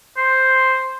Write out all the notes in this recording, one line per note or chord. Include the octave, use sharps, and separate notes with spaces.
C5